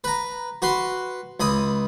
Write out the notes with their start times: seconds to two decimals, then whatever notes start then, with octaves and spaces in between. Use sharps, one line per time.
0.04 B4 A#5
0.62 F#4 B4 C6
1.40 C#2 B5 D#6